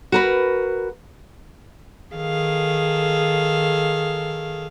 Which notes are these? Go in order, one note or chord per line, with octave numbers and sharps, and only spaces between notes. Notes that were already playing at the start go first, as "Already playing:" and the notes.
F#4 A#4 B4
D#3 G#4 A4 F5